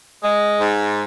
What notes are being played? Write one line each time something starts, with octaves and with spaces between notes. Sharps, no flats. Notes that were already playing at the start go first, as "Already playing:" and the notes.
G#3
G#2